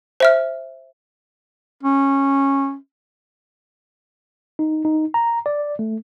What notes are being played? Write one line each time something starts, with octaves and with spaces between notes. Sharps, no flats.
C5 E5 F6
C#4
D#4
D#4
A#5
D5
A3